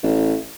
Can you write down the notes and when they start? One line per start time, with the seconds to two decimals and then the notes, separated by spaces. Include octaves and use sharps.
0.03 A1